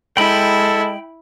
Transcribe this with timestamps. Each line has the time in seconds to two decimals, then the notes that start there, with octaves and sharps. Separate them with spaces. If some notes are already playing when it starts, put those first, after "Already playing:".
0.17 G#3 E4 A4 G5 B5